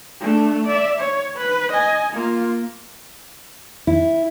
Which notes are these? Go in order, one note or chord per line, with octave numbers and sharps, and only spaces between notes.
A3 D4
D5 E5
C#5
B4
D#5 G#5
A#3 F4
E4